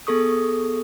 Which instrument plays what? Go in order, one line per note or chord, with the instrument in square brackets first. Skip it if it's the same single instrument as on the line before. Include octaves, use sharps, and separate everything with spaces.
[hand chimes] B3 G#4 A4 C#6 D#6